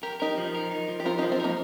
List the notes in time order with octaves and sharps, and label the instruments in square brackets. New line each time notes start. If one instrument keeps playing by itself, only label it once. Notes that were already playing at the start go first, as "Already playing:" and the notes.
[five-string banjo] G4 [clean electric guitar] A#4
[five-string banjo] D#4 G4 [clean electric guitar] A#4
[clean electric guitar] F3
A#4
D#4
F3
[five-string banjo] G4
[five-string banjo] C4 F4 [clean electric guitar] A#4
[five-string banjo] D#4 G4
[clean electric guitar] F3
[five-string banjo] C4 F4
[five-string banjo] A#3 D#4 [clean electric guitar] A#4